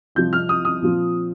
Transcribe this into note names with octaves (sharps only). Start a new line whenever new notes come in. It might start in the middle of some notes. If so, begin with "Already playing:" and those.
C2 C3 F3 G6
F6
D#6
D#6
A#2 F3 C4